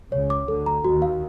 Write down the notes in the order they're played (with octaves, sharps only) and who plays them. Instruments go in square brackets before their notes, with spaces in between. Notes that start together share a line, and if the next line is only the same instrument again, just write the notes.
[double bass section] C#2 C#3 [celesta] C#5
[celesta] D6
[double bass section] D2 D3 [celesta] A4
[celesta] A#5
[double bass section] D#2 D#3 [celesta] F#4
[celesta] F5